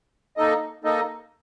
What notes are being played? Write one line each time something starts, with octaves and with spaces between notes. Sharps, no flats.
A#3 D#4 A4 D#5
A#3 D#4 A4 D#5